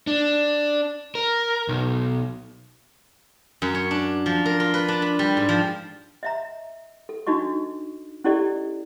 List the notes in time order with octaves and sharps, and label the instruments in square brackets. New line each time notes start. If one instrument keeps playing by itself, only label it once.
[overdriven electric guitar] D4
A#4
B1
[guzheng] F#2
C#5
D4
F3
A#4
F4
B4
D4
B5
G3
G#2
F3
[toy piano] D#5 E5 A#5
A4
D4 D#4 F#4 D#5 C#6
C#4 E4 G4 A4 D5 D#5